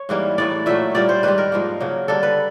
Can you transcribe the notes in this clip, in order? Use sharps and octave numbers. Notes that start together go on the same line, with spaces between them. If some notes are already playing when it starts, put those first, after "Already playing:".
Already playing: C#5
G#2 E3 G3 A#3
A2 E3 A3 D5
A#2 F#3 A3 E5
A#2 G3 A#3 D5
C5
G#2 D#3 G3 B4
A#4
G#2 F3 A#3
C#3 F#3 A#3
D3 G3 A#3 A4
B4